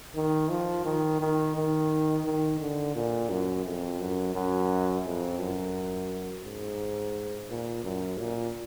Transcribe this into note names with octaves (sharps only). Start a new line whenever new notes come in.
D#3
F3
D#3
D#3
D#3
D#3
D3
A#2
F#2
F2
F#2
F#2
F2
F#2
G#2
A#2
F#2
A#2